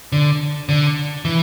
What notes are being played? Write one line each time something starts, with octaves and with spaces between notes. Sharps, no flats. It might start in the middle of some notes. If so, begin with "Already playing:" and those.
D3
D3
E3